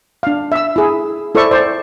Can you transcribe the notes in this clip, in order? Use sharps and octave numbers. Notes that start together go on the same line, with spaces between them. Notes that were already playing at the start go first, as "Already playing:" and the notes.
D4 F5
E5 E6
E4 G#4
E4 A4 C5 D5 E5 C#6
C5 D5